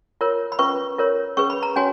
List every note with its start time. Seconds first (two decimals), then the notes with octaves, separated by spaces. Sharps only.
0.21 F4 A#4 C#5
0.52 B5
0.59 C#4 F4 B4 C#6
0.98 F4 A#4 C#5
1.37 C#4 G#4 B4 C#6
1.50 B5
1.63 A#5
1.76 C#4 F#4 C#5 G#5